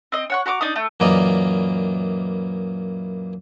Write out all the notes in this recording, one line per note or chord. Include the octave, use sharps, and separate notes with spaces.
C4 D#5
C#5 F#5 C#6
F#4 A#5 C#6 D6
D4 D#4 D#6
A3
F#2 A#2 E3 A#3 D5 D#5